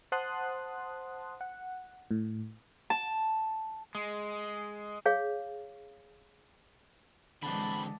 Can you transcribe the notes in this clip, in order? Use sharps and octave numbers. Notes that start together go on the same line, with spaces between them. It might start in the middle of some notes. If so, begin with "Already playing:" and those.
C5 F#5 A5 C6 D#6 F#6
F#5
A2
A5
G#3
G#4 C#5 F5
D3 E3 G#3 C4 D5 F#5 A5 B5